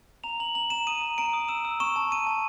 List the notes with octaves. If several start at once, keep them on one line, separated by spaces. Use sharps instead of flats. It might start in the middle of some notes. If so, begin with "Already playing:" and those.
A#5 F7
A#5 F#7
A#5 F#7
A#5 E7
D#6 D#7
A#5
A#5 D7
D#6
E6 E7
E6
C#6 E7
A5
C#6 D#7
A5